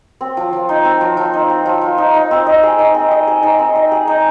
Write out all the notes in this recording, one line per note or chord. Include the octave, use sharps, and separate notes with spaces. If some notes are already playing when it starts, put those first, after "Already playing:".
C4
F3
F3
D#4
C4
F3
F3
D#4
C4
F3
F3
D#4
D#4
C4
D#5
G#4
D#4
C4
D#5
G#4
D#4
C4
D#5
G#4
D#4